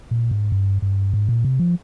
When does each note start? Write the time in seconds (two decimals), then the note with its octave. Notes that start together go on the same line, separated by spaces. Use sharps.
0.11 A#2
0.31 G#2
0.52 G2
0.82 G2
1.13 G#2
1.29 A#2
1.45 C3
1.59 F3